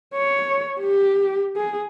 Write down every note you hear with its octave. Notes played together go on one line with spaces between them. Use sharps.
C#5
G4
G#4